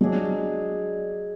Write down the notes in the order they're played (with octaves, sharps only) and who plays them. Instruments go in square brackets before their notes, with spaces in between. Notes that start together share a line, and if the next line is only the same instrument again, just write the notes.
[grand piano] F#3 [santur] G#3 D4 G#4 D5